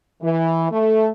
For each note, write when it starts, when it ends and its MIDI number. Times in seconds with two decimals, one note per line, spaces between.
0.22 0.67 52
0.71 1.09 57